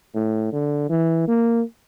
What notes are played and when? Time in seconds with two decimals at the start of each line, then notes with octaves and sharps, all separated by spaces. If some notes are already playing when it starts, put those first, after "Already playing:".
0.14 A2
0.52 D3
0.89 E3
1.28 A#3